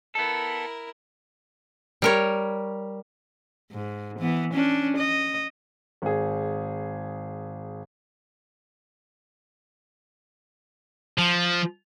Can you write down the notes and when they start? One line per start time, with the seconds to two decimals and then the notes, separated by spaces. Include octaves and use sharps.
0.15 B3 E4 A4 A#4
2.02 G3 A#4 C#5
3.71 G#2
4.19 E3 B3
4.53 C#4 D4
4.97 D#5
6.02 G#1 G#4
11.18 F3